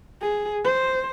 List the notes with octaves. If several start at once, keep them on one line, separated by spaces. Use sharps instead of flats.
G#4
C5